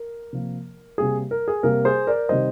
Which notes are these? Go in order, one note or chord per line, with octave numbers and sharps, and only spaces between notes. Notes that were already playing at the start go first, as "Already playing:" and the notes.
Already playing: A#4
C3 F3 A#3
C3 G3 A#3 G#4
A#4
G#4
C3 G3 A#3 A#4
G#4 C5
A#4 D5
C3 D#3 G3 C5 D#5